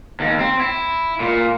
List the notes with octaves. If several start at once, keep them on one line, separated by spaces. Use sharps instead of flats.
D#2
C4
E4
A#2